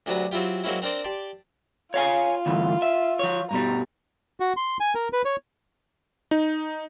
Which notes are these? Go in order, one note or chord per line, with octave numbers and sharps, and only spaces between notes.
D2 C3 F#3 D4 B4 A#5
F#3 C4 E4 F4 G4
F#3 G#3 A#3 C4 C#4 E4
C4 D4 A#4 C5 D5
G4 D5 A5 C6
F4 C#5 F5 G#5
D2 G2 E3
E5
F3 C#5
G2 B2 G3 A#5
F#4
C6
G#5
A#4
B4
C#5
D#4